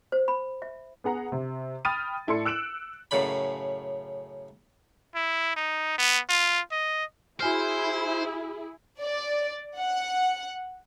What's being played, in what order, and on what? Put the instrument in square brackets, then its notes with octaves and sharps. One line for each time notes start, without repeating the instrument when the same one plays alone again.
[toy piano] C5
B5
E5
[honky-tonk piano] B3 G#4 F#5 A#5
C3
G5 B5 D#6 F6 A6 D#7
A2 E4 A4 D5 C6 C#7
E6 F#6 D7 E7 F#7
[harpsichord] F#2 A2 C#3 D5 B5
[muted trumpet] E4
D#4
B3
F4
D#5
[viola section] E4 G#4 [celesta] F#4 G#5 F6 [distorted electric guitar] C5
[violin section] D5
F#5